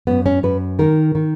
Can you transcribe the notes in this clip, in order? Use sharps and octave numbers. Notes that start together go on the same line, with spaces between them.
F#2 B3
C#4
F#2 B4
D#3 A#4
D#3